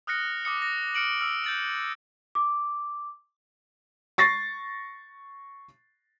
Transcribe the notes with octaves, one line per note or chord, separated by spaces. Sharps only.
D#6 F6 F#6 A#6 C#7
D6 D#6 C#7
A#6
F6 C#7 D7 F#7
E6 F6
G6 A6 F#7
D6
C#6 A6 A#6 C7